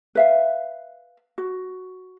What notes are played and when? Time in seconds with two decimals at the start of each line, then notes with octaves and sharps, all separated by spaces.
0.15 B4 E5 F5
1.38 F#4